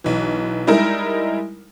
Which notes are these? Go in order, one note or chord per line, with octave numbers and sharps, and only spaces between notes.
B1 E3
G3 G#3 D#4 E4 A#4